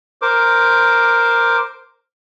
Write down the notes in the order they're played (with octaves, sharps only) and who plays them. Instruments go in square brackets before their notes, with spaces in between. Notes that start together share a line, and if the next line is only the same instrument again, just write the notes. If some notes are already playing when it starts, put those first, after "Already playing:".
[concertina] A#4 C5 D6